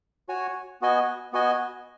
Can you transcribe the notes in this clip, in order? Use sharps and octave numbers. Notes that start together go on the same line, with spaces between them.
F#4 C#5 G#5
B3 F#4 D#5 G#5
B3 F#4 D#5 G#5